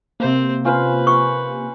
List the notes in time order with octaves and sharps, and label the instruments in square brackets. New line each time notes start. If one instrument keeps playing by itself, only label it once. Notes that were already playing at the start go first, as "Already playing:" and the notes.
[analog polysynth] C3 A#3 [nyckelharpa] C4 C5
[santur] C#4 F4 C5 [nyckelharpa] B4
[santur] F#5 [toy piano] C#6